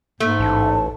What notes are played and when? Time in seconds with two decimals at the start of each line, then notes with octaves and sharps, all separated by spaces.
0.20 G#2 A3 A#3
0.40 A1 A5